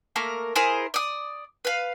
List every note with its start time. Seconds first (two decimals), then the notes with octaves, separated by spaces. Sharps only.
0.16 A3 A#3 A#4
0.56 E4 G#4 A#4 C5
0.94 D5 D#6
1.65 B4 F5